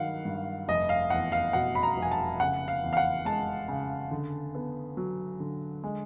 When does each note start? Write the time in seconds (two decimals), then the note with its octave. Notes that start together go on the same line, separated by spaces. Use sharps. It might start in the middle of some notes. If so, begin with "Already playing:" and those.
Already playing: G2 D#3 F#3 F5 F#5
0.25 G2
0.68 F1 D#5
0.89 F5
1.10 E2 F#5
1.32 F5
1.53 B2 F#5
1.75 B5
1.83 A#5
1.97 F1
2.02 G#5
2.12 A5
2.40 C#3 F#5
2.68 F5
2.83 E2
2.93 F5
2.97 F#5
3.25 G#3 A5
3.68 C#3
4.11 D3
4.55 B3
4.97 F#3
5.40 D3
5.84 G#3